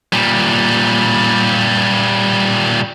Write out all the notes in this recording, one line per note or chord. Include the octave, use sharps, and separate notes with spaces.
A#2 G3